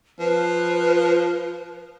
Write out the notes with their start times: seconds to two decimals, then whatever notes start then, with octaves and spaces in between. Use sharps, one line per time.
0.19 F3 B4